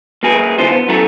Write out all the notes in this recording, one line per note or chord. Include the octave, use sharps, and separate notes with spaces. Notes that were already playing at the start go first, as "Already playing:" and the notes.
A#3 F#4 G#4 A#4 B4
D3 E3 B3 D4 F4 C5
B3
F#2 E3 A3 B3 F#4 A#5